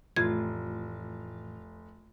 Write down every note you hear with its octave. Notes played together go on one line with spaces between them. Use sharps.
F1 A2 E3 F4 G#6